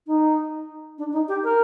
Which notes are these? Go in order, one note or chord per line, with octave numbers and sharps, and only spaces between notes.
D#4
D4
D#4
G4
A#4